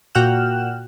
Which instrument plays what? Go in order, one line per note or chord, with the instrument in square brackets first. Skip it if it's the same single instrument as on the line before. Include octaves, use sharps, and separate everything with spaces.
[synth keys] A#2 F#4 G5 F6 F#6 E7